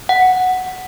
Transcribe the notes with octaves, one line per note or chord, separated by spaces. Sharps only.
F#5